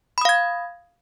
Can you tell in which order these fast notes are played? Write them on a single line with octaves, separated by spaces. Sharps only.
B5 D#6 F5 G#6